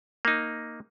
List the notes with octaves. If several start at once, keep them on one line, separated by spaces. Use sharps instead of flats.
A#3 D#4